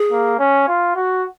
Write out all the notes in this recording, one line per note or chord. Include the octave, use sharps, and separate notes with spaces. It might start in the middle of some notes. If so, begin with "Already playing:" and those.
Already playing: G#4
A#3
C#4
F4
F#4